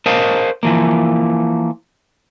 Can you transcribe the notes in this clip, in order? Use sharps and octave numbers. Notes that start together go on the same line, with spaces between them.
A#4 C5 D#5 F5 A5
E3 F3 A#3